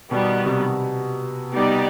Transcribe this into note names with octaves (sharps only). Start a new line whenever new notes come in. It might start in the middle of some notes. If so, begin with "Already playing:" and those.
B2 D#3 G3 B3
C3
G3 B3 D#4 G4 D5